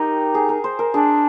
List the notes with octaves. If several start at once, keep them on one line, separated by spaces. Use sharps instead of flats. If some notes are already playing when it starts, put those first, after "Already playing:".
Already playing: D#4 G4 A#4
G#4
A#4
C5
A#4
D4 G#4